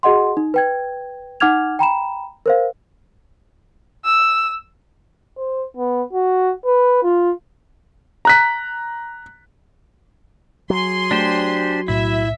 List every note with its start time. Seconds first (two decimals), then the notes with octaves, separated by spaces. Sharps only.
0.03 F#4 G#4 D#5 F#5 C6
0.37 D#4
0.54 B4 G5 G#6
1.40 D#4 F#5 D6 F6 G#6 F7
1.79 G5 A#5 B5 E7
2.46 A#4 C5 F5
4.05 E6
5.37 C5
5.77 B3
6.13 F#4
6.65 B4
7.03 F4
8.25 A#5 F#6 B6
10.70 F#3 G#4 C6
11.11 A3 D4 G4 C5
11.88 B1 A2 E4 E5